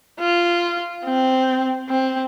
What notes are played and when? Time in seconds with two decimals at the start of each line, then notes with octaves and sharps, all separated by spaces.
0.19 F4
1.05 C4
1.89 C4